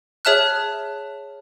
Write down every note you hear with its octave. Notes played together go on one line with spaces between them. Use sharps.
G#4 C#5 E5 A5 F6 F#6